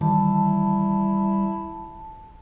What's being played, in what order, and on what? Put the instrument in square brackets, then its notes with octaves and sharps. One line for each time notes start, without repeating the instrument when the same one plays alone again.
[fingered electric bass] D#3 E3 [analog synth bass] G3 [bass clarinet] E4 [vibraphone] A5